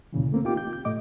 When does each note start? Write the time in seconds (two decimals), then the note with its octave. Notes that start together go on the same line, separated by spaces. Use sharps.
0.13 D2 A#2 C#3 E3
0.32 A3 A#3 C4
0.45 D#4 F4 G4 G5 D6
0.57 G6
0.73 G6
0.85 A2 A3 D#5 D6